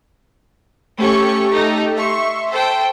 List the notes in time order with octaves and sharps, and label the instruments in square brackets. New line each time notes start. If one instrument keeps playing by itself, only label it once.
[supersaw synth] A3 G4 A4 [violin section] C#4 C#6
[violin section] D#4
[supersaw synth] E5 C6 [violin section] C#6
[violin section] A4 C5 G5